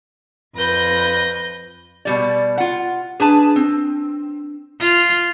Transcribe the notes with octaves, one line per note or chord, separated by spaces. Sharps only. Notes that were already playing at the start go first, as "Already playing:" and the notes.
F2 B4 G6 A#6
B2 G3 D5
F4 F#5
D4 G#4 B4 A5
C4
F4